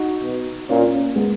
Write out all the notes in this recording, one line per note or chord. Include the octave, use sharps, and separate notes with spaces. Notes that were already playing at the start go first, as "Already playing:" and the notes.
Already playing: D#4 F#4
B2
A#2 C#4 F4
A#3 C#4
G#3 B3